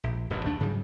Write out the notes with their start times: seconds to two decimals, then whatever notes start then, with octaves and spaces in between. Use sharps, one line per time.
0.04 A#1
0.30 D#1 A1 G2 B2
0.45 D#2 A3 D4
0.60 G#2 C#3 F#3 G3